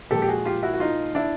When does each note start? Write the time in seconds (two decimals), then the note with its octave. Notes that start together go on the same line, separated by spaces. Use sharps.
0.11 A#2 F3 G#3 G4 A4
0.22 G4
0.28 F#4 G#4
0.45 F4 G4
0.63 E4 F#4
0.73 F#4
0.80 D#4 F4
1.15 D4 E4